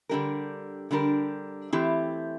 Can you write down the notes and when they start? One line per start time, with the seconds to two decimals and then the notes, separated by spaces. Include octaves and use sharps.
0.09 D3 G3 D4 G4 A#4
0.91 D3 G3 D4 G4 A#4
1.73 E3 A3 C4 E4 G4